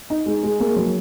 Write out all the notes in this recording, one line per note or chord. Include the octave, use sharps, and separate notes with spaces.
D#4
G#3
G#3
A#3
F#3